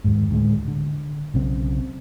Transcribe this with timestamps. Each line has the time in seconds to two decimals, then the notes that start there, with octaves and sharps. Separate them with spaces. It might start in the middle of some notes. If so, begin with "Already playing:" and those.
0.04 D#2 G#2
0.31 D2 A2 G#3
0.68 D3
1.34 B1 C#3 C4